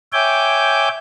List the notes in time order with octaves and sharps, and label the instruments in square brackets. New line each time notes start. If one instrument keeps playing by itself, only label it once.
[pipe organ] C#5 E5 G5 G#5 D6 G6